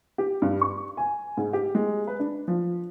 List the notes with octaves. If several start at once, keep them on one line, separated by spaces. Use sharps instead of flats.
G4
G2
C#6
G#5
G#2
G4
G#3
B4
D4
F3